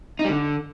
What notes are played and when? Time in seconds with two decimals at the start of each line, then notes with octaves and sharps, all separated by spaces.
0.19 D#4
0.24 G3
0.30 D3